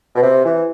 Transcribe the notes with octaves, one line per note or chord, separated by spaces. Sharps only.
B2
C3
E3